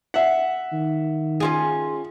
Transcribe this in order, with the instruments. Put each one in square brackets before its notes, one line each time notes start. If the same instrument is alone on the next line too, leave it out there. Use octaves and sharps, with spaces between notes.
[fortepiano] E5 F#5
[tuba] D#3
[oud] C#4 F4 G#4